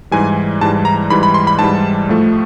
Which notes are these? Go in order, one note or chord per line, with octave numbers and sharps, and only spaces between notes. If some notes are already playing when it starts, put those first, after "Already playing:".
G#2 E3 G3 G#5
G#2 E3 G3 A5
A#5
G#2 E3 G3 B5
B5
C6
B5
G#2 E3 G3 A5
A2 F3 A3